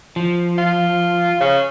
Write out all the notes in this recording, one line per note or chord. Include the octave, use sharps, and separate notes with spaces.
F3
F4
C#3